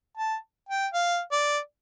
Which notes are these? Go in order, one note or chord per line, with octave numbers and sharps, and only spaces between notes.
A5
G5
F5
D5